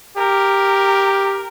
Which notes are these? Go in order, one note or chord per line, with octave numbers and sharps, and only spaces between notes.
G4 A#4